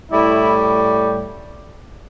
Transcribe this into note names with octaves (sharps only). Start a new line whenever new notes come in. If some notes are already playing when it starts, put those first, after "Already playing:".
A2 G3 E4